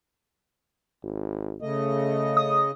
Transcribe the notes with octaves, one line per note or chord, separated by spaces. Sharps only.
G#1
C#3 A3 D#5
D#6